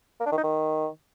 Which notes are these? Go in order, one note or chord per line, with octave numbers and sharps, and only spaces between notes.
A#3
D4
D#3
D#4
D#3